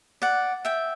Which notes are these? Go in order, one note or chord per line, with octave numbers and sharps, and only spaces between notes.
D5 F#5
E5 G5